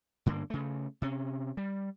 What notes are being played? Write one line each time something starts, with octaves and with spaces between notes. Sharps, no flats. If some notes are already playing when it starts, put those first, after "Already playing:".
G2 D3 A#3
C#3 A3
C3 C#4
G3